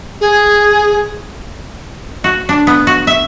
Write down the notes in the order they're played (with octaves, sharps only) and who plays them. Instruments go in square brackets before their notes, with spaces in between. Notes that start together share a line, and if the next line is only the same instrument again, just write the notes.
[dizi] G#4
[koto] F#4
D4
B3
F#4
E5